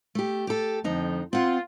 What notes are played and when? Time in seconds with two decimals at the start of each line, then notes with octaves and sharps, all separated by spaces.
0.15 A3 G4
0.47 G4 A4
0.84 F2 D3 F3 D#4
1.33 C4 F4 F#5